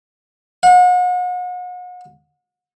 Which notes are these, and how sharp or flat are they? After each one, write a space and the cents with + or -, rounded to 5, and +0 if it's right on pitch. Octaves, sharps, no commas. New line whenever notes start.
F#5 -40